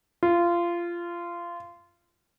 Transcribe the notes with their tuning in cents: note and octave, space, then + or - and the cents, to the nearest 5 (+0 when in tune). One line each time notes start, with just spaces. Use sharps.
F4 -20